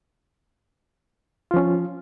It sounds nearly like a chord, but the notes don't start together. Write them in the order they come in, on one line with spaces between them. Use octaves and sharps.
F4 F3 C#4